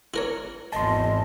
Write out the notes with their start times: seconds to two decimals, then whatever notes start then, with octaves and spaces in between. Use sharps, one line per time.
0.14 E4 A#4 C#5
0.72 G#1 E2 D#5 A5 C6